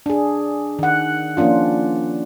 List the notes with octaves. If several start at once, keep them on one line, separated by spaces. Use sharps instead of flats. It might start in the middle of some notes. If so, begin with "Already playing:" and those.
D4 G#4
D#3 F#5
F3 A#3 C#4 D4 F4